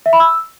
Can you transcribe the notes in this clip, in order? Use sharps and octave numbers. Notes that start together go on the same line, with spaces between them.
E5
B5
E6